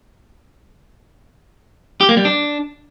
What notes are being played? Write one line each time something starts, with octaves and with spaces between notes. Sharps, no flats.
G4
A#3
G3
D4